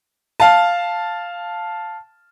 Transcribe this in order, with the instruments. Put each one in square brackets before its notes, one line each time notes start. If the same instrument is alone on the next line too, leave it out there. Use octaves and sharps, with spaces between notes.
[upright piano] F5 A5